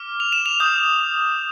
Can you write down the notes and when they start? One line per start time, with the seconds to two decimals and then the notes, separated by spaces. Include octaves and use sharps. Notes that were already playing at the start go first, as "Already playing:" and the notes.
Already playing: D6 F6
0.20 F7
0.32 E7
0.46 F7
0.60 D#6 G6